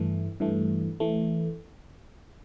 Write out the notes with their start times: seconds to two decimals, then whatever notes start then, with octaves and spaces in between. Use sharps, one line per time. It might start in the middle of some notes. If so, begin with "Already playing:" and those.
Already playing: G2 E3 A3
0.40 G2 E3 A3
1.00 E3 A3